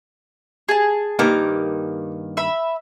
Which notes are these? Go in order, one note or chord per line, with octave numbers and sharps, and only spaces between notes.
G#4 A5
G2 D#3 A#3 D6
E5 B5